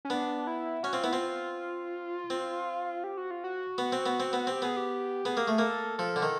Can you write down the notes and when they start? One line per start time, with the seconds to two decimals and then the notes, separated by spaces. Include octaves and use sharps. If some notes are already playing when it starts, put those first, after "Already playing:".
0.05 C#4
0.10 B3 D4
0.47 E4
0.83 C#4 F#4
0.93 C4 F4
1.03 B3 E4
1.12 C4 F4
2.30 C4
3.04 G4
3.17 F#4
3.31 F4
3.44 F#4
3.78 B3
3.92 C4
4.06 B3
4.20 C4
4.33 B3
4.47 C4 G4
4.62 B3 G#4
4.77 G4
5.25 B3 G#4
5.37 A#3
5.48 A3
5.58 A#3 A4
5.98 F3 A4
6.16 D3
6.22 D#3